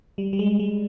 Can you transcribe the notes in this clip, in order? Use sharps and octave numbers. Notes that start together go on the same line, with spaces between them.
G3
G3
G#3
G#3